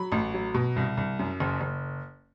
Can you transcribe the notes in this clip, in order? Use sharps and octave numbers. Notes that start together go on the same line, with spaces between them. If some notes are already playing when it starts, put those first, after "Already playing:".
Already playing: F#3 B5
A1
F#3
B2
C2
C2
F#2
F#1
F#1